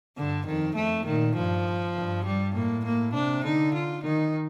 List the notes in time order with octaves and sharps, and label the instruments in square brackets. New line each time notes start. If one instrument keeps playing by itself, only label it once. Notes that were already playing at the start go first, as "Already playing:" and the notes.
[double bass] G2 [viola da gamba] D3
[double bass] F2 [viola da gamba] D#3
[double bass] F2 [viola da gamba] A3
[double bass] A#2 [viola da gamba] D#3
[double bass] G2 [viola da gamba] F3
[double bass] G2
[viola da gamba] G3
[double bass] A2 [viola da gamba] A#3
[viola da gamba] A#3
[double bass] C3 [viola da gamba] D4
[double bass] D3 [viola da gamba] D#4
[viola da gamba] F4
[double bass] D#3 [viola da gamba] D#4